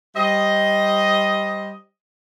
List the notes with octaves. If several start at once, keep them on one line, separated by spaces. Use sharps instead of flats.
G3 C5 D#5